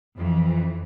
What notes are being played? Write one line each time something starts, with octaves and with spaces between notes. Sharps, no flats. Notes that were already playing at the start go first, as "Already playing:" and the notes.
F2 E3